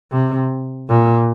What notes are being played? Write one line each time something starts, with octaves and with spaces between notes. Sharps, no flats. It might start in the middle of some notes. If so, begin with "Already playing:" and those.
C3
A#2